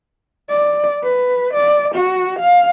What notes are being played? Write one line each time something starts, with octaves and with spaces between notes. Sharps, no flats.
D5
B4
D5
F#4
F5